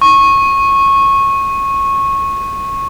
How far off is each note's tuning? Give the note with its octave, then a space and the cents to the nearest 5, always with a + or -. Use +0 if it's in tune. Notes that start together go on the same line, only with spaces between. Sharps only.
C#6 -20